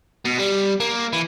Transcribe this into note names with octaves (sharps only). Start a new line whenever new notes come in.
B2
G3
A#3
E3